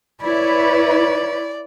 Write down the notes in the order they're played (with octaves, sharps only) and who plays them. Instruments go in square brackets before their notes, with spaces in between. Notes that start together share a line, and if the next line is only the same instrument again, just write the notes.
[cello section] E4 B4 C#5 [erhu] D5